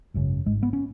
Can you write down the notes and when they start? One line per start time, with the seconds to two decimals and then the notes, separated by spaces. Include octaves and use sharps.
0.14 G#1 F#2 C#3
0.46 G#1 G#2 G#3
0.63 B3
0.73 C#4